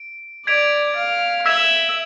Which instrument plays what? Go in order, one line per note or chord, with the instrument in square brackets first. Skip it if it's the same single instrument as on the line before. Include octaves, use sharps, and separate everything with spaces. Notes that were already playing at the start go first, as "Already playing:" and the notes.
Already playing: [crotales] D7
[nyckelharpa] D5 [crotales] G#6 B6 D7 F7
[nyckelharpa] F5
[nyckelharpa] E5 [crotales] E6 G#6 B6 E7